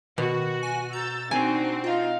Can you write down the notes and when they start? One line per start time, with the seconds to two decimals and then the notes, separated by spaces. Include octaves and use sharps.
0.18 B2 D#3 F#4
0.63 G#5
0.93 A#5 E6 G6 A6
1.31 C4 D4 D#4 F#4 G#5
1.84 D#4 F4 F5